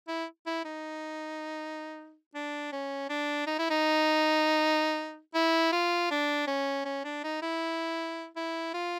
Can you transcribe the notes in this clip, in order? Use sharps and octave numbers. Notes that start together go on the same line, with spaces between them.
E4
E4
D#4
D4
C#4
D4
D#4
E4
D#4
E4
F4
D4
C#4
C#4
D4
D#4
E4
E4
F4